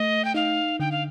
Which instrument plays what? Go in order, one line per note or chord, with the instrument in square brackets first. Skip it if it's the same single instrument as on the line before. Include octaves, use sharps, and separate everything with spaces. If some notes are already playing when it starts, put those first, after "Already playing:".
Already playing: [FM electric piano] A3 [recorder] D#5
[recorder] G5
[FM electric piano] D#4 [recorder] F5
[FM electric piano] D3 [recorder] G5
[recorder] F5